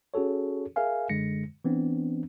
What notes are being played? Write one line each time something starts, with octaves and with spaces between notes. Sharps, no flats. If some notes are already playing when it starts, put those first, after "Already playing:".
C#4 F#4 G#4 A4 C#5
G#4 A#4 E5 F5 G#5
F#2 D3 G#3 A#6 C#7
E3 B3 C4 D4